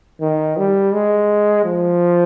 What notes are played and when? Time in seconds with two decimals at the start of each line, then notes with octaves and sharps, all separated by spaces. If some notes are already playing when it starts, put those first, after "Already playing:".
0.21 D#3
0.57 G3
0.94 G#3
1.65 F3